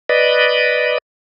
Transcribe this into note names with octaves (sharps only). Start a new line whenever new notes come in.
B4 D5 D#5